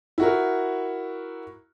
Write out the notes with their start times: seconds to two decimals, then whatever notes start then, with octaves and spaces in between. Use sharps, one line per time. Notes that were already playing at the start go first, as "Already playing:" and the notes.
0.18 E4 F#4 A#4